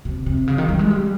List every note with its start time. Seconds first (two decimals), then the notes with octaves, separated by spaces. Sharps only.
0.05 C3
0.26 C3
0.48 C#3
0.58 D#3
0.69 G3
0.79 G#3
0.91 G3